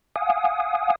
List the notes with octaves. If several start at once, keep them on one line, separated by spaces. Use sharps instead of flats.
F5 F#5 G#5 D#6